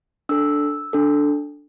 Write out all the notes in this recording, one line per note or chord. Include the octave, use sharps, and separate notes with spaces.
D4 A4 E6
D4 A4